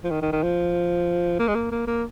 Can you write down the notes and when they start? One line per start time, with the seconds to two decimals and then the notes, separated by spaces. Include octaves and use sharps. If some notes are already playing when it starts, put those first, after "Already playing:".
0.04 F3
0.10 D#3
0.22 D#3
0.32 D#3
0.43 F3
1.39 A#3
1.48 G#3
1.55 A#3
1.71 A#3
1.87 A#3